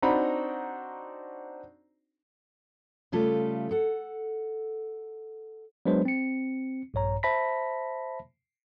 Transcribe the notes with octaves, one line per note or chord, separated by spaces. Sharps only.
C4 D4 D#4 F#4 A#5 B5
C#3 G3 A3 F4 A4
A4 F#5
F#3 G#3 B3 D4 B4 C5
C4 C#7
A#1 G2 C#5 A#5
C5 E5 A5 B5 A#6 B6